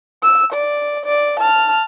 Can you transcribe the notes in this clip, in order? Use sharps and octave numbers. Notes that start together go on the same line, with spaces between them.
E6
D5
D5
A5 F6